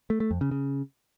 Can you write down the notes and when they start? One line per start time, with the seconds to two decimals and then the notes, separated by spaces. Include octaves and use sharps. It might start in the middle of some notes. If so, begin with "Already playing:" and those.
0.10 A3
0.20 A3
0.31 F2
0.41 C#3
0.51 C#3